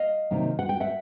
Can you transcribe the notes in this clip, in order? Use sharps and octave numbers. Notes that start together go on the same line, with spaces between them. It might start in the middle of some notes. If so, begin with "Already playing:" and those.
Already playing: D#5 F5
C3 D#3 F#3 A#3
F#5
G5
E5 F#5